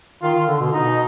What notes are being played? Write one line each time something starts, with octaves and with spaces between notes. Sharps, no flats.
D#3 F4
D3
B2
B2 D#4